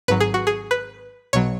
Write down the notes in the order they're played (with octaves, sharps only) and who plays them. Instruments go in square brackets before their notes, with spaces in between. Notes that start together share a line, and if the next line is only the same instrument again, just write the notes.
[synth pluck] G#1 G#2 F#3 B4
G#4
F#4
G#4
B4
B1 B2 F#3 C#5